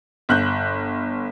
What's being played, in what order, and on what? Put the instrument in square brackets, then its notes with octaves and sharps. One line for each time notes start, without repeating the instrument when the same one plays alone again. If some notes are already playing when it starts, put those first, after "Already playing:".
[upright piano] G1 F#6 G6